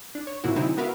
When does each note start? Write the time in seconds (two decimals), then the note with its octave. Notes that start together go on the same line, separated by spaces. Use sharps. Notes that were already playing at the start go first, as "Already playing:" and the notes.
0.15 D4
0.27 C#5
0.44 G#2 C3 F3 A#3 E4 F#4
0.56 D3 F#3 G#3 C4 D#4 E4
0.77 B3 F#4 A#4 B4 E5 F5